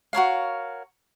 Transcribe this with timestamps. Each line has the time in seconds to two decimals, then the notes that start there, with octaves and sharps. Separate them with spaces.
0.13 F#4 A#4 C#5 F5